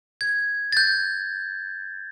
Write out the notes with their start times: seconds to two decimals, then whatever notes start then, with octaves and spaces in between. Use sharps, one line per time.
0.21 G#6
0.72 G6 A6